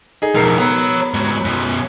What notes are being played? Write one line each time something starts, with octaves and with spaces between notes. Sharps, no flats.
D#4 G#4
E1 F3 D#4 A#4 C7
B3 C#5 A#5
G#2 F#3
F#2 B2